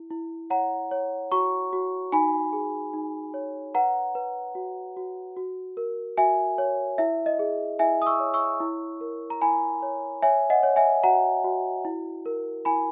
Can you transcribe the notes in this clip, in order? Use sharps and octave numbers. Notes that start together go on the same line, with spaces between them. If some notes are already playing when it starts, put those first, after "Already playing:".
Already playing: E4
E4
C#5 F#5 A#5
C#5
F#4 A#5 C#6
F#4
D#4 G#5 B5
G#4
D#4
C#5
B4 F#5 A#5
B4
F#4
F#4
F#4
A#4
F#4 E5 G#5
C#5
E4 E5
D#5
G#4
E4 E5 G#5
D#6
C#6 E6
C#5
C#6 E6
E4
A#4
A#5
E4 G#5 B5
C#5
C#5 E5 G#5
D#5 F#5
C#5
E5 G#5
F#4 F#5 A#5
F#4
E4
A#4
E4 G#5 B5